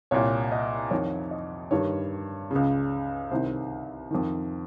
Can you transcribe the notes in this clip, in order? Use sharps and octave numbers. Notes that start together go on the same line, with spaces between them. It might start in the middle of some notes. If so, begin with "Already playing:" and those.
C2 A#2 C#5
D#5
F2 D#3 C#5
D#5
G2 D#3 C#5
C#2 C#3
C2 C3 D#3 C5
F2 D#3